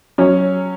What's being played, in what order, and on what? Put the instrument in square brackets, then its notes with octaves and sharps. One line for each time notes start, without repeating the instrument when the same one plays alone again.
[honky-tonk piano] F#3 C#4 C#5